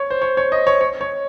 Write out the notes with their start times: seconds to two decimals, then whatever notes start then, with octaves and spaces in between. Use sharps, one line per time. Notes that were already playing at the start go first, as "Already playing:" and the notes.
Already playing: C#5
0.10 C5
0.22 C#5
0.37 C#5
0.52 D#5
0.67 C#5
0.81 C#5
1.01 C#5